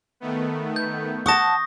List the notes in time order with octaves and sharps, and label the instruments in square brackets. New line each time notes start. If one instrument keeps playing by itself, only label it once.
[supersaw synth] D#3 A3 B3
[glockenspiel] G6
[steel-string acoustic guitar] F#5 A5 [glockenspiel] C#6 D#6 A#6